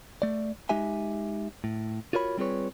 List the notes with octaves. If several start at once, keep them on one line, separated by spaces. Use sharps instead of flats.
A3 D5
G#3 D#4 G4 E5 G#5
A2
F4 F#4 A#4 C#5 B5
G3 C4 F4 G#4 B4 C#5